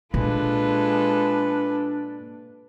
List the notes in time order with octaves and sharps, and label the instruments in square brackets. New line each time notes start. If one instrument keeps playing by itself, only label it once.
[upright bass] A#2 [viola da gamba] G#3 F4 A4 [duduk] D4 [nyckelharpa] B4